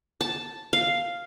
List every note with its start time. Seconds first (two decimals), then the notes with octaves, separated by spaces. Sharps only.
0.21 A5
0.73 F5